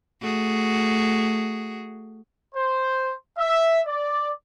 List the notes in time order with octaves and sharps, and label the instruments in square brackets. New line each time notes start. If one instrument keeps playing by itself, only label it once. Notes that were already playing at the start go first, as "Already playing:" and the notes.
[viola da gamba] A3 F#4 G#4
[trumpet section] C5
E5
D5